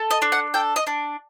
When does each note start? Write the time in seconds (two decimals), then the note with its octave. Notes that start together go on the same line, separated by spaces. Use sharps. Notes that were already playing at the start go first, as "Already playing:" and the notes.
Already playing: A4
0.11 D#5
0.22 D4
0.32 F#5
0.54 A4 G5
0.76 D#5
0.87 D4